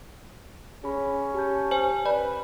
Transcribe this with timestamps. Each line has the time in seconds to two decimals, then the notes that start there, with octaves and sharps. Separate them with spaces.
0.84 C#4 G#4 B5
1.34 G4 A5 G6
1.71 C5 G#5
2.06 B4 D5 B5